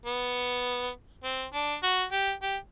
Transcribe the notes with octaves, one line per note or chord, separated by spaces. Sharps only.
B3
C4
D4
F#4
G4
G4